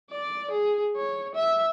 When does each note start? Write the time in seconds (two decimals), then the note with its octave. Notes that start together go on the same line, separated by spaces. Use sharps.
0.11 D5
0.51 G#4
0.96 C#5
1.35 E5